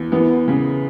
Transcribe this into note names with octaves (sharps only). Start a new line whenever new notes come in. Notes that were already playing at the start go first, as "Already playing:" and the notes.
Already playing: E2
E3 B3
C#3